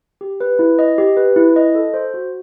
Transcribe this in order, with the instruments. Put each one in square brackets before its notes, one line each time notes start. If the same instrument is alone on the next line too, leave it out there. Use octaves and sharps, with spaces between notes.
[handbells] G4
B4
E4
D#5
G4
B4
E4
D#5
A4
C5
F#4